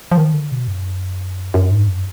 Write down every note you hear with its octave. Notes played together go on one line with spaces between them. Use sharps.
F3
D#3
D3
B2
F#2
F#2
G#2
F#2